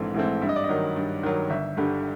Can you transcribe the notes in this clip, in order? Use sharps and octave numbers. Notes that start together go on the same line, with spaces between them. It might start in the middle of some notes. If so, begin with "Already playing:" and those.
Already playing: A#1 G#2 E3 A3 C4
G#2 E3 A3 C4
G2 E5
D#5
D5
D#5
D#3 F#3
G2
D#3 F#3
G1 E5
G2 D3 G3